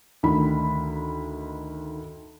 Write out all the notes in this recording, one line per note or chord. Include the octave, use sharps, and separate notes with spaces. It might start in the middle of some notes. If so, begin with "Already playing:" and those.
D2 D#3 B5